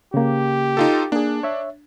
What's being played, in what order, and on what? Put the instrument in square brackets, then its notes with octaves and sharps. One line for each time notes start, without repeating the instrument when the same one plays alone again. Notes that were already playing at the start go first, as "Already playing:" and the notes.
[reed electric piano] C#3 A#3 [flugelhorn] G4
[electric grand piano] D#4 F4 A4
[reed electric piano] A#3 G#4 [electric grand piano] D4
[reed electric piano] C#5 E5